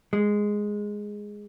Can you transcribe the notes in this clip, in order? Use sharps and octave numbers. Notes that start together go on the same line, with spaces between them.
G#3